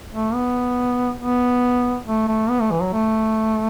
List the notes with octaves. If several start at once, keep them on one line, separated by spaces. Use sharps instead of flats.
A3
B3
B3
A3
A3
B3
A3
E3
F#3
A3